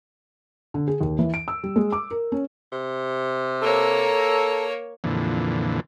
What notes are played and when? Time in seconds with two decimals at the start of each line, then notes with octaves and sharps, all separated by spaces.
0.74 D3
0.88 G#4
1.01 D#2
1.19 E3
1.34 D7
1.48 E6
1.63 G3
1.76 G#3
1.92 D6
2.11 A#4
2.32 C#4
2.72 C3
3.63 A#3 A4 C#5 A#5
5.04 F2 A#2 D3 E3